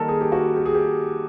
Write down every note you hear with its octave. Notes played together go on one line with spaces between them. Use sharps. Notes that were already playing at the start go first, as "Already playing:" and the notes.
Already playing: D#3 G3 A#3 A4 A#4
G#4
G4
F#4
G4
G#4
G4